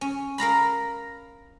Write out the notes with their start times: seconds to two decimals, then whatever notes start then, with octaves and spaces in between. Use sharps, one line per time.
0.01 C#4
0.38 A#4 F5 A#5 B5